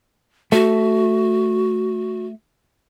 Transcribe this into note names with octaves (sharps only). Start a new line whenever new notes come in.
A3 F#4